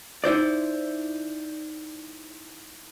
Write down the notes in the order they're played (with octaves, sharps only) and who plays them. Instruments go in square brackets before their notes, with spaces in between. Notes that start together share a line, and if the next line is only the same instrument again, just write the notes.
[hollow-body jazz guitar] D#4 E4 C5 D5